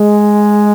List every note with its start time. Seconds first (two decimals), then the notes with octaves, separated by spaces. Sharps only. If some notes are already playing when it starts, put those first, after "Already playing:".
Already playing: G#3